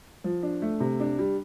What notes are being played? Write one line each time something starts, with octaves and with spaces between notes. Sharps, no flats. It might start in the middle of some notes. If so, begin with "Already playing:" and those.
F3
D4
A3
C3
D4
G3